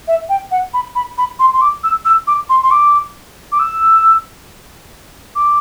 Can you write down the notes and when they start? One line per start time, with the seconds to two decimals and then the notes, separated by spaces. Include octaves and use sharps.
0.08 E5
0.29 G5
0.51 F#5
0.74 B5
0.95 B5
1.18 B5
1.39 C6
1.53 C6
1.61 D6
1.83 E6
2.05 E6
2.27 D6
2.49 C6
2.63 C6
2.71 D6
3.52 D6
3.59 E6
5.35 D6